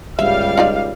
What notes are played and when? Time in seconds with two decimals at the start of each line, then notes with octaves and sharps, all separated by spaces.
0.19 G1 C#2 G3 E5 F5
0.58 D#4 F4 D5